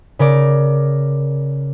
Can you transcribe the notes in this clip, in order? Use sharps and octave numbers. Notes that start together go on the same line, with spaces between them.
C#3 A#4 D5